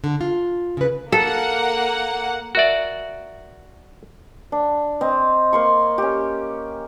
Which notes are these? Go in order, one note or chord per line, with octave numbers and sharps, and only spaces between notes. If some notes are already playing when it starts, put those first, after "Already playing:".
D3
F4
C#3 B4
A#3 A4 F#5
F#4 A#4 D5 E5
D4
C4 D#5
A#3 C6 C#6
C#4 G4